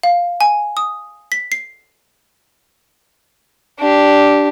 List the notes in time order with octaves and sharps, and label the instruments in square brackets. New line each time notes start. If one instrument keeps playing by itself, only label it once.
[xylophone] F5
G#5
D#6
B6
C7
[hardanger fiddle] D4 G4